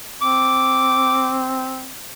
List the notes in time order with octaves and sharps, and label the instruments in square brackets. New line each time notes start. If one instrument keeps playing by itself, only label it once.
[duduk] C4 [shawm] D6